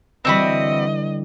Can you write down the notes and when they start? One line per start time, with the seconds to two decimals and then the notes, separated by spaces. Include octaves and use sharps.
0.25 D3 E3 G3 C4 F#4 D#5 B5